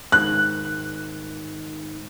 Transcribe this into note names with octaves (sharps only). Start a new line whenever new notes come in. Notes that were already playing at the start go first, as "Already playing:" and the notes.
G#2 D#3 F#6